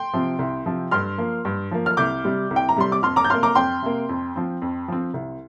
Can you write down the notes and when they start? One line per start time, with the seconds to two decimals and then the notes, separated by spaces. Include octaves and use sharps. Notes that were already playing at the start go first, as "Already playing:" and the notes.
Already playing: G5 C6
0.13 C3 F3 C4
0.39 C2
0.66 C3 F3 C4
0.91 G2 C6 F6
1.18 F3 A#3
1.45 G2
1.71 F3 A#3
1.86 F6
1.97 C2 D6 G6
2.24 C3 G3 C4
2.51 C2
2.56 G5
2.69 A#5
2.76 C3 G3 C4 C6
2.92 D6
3.03 F2 C6 F6
3.16 A#5 D6
3.24 G6
3.30 C3 A#3 C6 F6
3.43 A#5 D6
3.55 F2 G5 C6
3.82 C3 A#3
4.09 F2
4.36 F3 C4
4.62 F2
4.88 F3 C4
5.14 C2